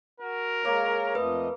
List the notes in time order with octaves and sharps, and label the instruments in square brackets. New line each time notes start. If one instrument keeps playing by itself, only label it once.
[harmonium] F#4 [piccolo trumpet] A#4
[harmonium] G#3 C#5 A#5 [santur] A#3
[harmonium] F2 A3 D#5 [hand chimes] B4